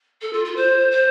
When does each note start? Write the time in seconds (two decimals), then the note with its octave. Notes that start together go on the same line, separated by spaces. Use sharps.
0.21 A4
0.33 F4
0.44 F4
0.56 C5
0.91 C5